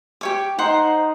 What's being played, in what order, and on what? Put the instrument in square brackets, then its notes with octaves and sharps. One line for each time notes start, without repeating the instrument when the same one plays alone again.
[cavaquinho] G4 C#5 D6
[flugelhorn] D#4 [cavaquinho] C5 F#5 C6